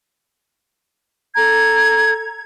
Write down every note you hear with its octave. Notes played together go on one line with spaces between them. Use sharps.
A4 A#5 G#6